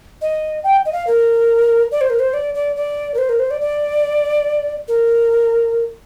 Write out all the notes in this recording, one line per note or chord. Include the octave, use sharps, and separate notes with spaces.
D#5
G5
D#5
F5
A#4
D5
C5
A#4
C5
D5
D5
D5
A#4
C5
A#4
C5
D5
D5
A#4